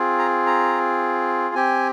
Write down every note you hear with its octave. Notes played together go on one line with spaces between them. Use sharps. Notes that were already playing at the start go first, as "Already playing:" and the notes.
Already playing: C4 F4 G#4
A#5
A#5
C4 G4 G#5